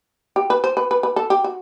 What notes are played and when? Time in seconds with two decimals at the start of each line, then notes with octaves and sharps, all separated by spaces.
0.36 G4
0.50 B4
0.64 C5
0.77 B4
0.91 B4
1.03 B4
1.16 A4
1.30 G4
1.44 F#4